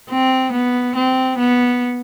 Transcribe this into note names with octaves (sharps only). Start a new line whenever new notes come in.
C4
B3
C4
B3